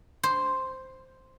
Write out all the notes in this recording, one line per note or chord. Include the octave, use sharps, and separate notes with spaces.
C5